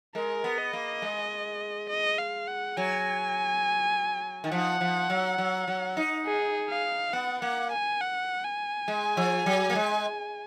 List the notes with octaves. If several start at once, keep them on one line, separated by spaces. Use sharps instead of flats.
G#3 A#4
B3
D#5
A#3
G#3
D#5
F5
F#5
F#3 G#5
D#3
F3 F#5
F3
F#3
F#3
F#3
D#4
G#4
F5
B3 F#5
A#3 F#5
G#5
F#5
G#5
G#3
F3
F#3
A#3
G#3